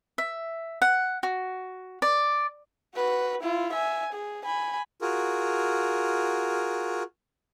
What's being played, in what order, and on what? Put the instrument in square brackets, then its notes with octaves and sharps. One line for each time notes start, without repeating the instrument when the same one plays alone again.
[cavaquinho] E5
F#5
F#4
D5
[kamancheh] F#4 B4
E4 F4
E5 G#5
G#4
G#5 B5
[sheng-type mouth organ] F4 F#4 G#4 A#4